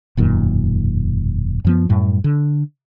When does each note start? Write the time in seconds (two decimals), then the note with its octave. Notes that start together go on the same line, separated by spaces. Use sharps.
0.17 E1 F#2 A#2 D#3
1.65 F#2 F3 B3
1.89 F#2 A2 G3
2.24 D3